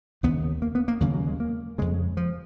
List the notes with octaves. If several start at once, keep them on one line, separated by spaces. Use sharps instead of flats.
D#2 C#3 B3
A#3
B3
A#3
D#2 C#3 F#3
F#3
G#3
A#3
F2 C#3 G#3
F3